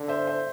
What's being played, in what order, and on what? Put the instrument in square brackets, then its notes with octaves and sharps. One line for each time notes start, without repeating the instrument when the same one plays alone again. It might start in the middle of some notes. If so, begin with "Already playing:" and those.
Already playing: [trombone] D3
[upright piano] C5 E5
C5 E5